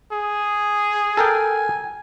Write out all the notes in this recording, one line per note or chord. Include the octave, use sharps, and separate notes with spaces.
G#4
A4 A#4 G5 G#5